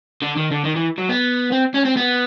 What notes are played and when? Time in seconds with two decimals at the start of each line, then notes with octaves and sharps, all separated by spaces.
0.22 D3
0.37 D#3
0.51 D3
0.65 D#3
0.76 E3
0.98 F#3
1.09 B3
1.52 C4
1.74 C#4
1.85 C4
1.96 B3